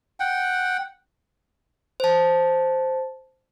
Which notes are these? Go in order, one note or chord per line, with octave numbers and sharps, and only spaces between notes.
F#5 G5
C5 A5